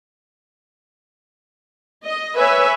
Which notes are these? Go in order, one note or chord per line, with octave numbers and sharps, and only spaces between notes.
D#5
B4 C#5 E5 G#5